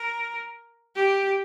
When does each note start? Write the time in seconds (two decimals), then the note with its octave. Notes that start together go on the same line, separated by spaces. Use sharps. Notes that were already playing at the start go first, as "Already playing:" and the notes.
Already playing: A#4
0.96 G4